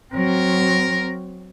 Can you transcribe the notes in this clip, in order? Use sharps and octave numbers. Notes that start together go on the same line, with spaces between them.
F#3 C4 A#4